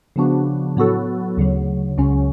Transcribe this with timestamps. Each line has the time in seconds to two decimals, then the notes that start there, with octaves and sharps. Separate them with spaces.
0.16 C#3 F3 B3 D4 F#4
0.77 A2 F#3 B3 F#4 A4
1.37 D2 C#3 F#3
1.98 C#2 C#3 F#3 C#4